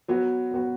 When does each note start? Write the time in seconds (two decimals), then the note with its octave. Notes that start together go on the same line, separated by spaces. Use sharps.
0.08 F#3 B3 F#4
0.51 F#3 B3 F#4